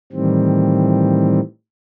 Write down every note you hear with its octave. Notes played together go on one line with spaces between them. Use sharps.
A2 D#3 E3 G3 C4